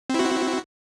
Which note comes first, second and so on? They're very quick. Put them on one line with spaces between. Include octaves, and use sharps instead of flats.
C4 E4 F#4